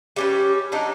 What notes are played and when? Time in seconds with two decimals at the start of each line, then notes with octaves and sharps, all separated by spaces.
0.16 G3 C#4 B4
0.72 F#3 D4 D#4